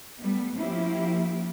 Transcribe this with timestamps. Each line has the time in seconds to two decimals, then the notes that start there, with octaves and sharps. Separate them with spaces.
0.20 G3 A3 B3
0.57 F3 A#3 C#4 E4 G4